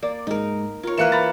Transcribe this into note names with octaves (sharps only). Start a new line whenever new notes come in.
A#3 D5
G#2 D#4 A#4
F4 A#4 C#5
E3 A#3 B4 F#6 C#7 E7
A#5 B5 A6